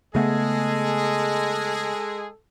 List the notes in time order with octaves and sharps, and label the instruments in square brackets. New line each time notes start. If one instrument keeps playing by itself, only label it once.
[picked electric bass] C#3 A3 B3 [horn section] G#3 G#4 [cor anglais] A4